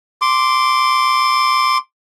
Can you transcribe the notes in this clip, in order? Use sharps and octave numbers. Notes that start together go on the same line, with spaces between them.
C6 D6